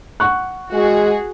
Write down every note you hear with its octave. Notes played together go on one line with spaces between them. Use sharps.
F#5 C#6 F#6
G#3 F#4 G#4